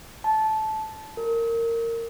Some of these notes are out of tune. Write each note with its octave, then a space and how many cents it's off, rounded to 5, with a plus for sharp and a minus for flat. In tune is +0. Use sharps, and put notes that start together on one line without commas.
A5 -15
A#4 -20